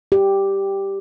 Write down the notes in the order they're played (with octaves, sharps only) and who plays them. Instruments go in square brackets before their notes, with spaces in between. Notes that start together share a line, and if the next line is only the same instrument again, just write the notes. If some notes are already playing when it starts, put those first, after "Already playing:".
[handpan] G4